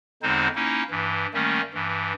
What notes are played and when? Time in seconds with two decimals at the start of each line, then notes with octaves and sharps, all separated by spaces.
0.22 E2 D3 G#3 C4 D#4 C5
0.55 A#3 C#4 D#4 E4
0.90 G2 E3
1.34 D#3 G3 A3 A#3 C#4
1.74 G2 E3